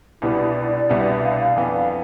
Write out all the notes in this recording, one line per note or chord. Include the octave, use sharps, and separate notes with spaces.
C2 B2 G3 B3 D4 E4
D5
C2 B2 G3 B3 D4 E5
F5
F2 E3 B3 D4 F5